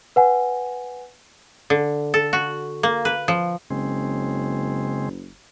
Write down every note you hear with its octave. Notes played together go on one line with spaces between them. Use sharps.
B4 F#5 G#5
D3
A4
F#4
A#3
B4
F3
F#1 C#3 G#3 C4